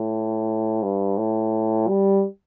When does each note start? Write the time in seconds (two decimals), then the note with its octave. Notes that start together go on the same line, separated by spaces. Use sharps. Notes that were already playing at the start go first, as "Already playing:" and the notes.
Already playing: A2
0.83 G2
1.18 A2
1.88 G3